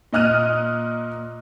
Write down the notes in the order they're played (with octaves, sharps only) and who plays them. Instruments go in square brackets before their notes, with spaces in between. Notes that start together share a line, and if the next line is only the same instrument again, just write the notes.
[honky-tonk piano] A#2 D#5 F6 F#6 D#7